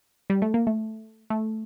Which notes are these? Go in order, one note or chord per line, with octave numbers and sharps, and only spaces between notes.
G3
A3
A#3
A3
A3